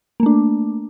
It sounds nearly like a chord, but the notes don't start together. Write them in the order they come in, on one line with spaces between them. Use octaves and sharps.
A#3 A3 D4